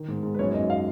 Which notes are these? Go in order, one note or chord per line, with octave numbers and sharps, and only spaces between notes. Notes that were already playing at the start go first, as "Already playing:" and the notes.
Already playing: D#3
G#2
G#2
B4
F#2 C#5
F#2 D#5
F5